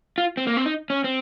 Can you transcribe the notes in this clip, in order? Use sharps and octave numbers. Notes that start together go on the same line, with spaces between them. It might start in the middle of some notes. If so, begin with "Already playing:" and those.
F4
C4
A#3
C4
D#4
C#4
C4